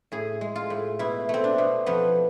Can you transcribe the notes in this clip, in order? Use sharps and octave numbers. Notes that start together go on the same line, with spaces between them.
A2 G#4
G#3
F4
A2
B2 E4
A3 C4
D4
B2
F2 B3